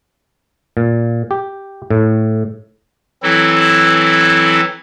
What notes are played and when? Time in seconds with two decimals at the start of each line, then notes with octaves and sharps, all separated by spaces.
0.77 A#2
1.31 G4
1.90 A2
3.23 E3 F#3 C4 E4 A4